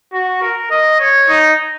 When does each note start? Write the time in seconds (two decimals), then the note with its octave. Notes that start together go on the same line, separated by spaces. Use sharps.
0.13 F#4
0.42 A#4
0.71 D#5
0.99 C#5
1.28 D#4